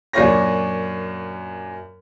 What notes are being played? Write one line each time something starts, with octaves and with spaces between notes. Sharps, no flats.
F#2 A#2 D4 F4 C#5 A#6